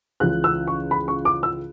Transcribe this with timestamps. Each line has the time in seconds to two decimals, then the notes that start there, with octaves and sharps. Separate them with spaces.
0.20 C#2 C#3 E3 F#6
0.44 E6
0.67 C#6
0.91 B5
1.08 C#6
1.25 D6
1.43 E6